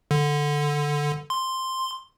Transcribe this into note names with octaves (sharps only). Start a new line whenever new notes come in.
D3
C6